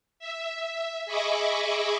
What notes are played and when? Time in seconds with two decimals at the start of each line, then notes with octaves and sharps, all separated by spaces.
0.19 E5
1.06 G#4 D#5 E5 B5 C#6 D6